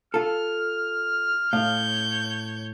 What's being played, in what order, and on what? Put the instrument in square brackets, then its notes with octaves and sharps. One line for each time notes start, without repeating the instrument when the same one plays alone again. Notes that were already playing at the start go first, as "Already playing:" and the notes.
[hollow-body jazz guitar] F4 A4 [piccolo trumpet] F6
[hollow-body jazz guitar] A2 [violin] C#5 G6 [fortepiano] F5